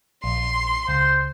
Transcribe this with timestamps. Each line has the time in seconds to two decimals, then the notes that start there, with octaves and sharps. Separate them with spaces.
0.24 A#1 C6
0.88 C#2 C5